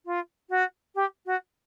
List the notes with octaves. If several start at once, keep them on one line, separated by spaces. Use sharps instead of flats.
F4
F#4
G4
F#4